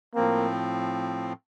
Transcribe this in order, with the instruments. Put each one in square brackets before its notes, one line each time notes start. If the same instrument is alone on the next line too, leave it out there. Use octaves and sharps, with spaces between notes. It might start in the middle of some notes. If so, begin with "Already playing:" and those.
[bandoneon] A2 F3 C4 [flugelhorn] A#3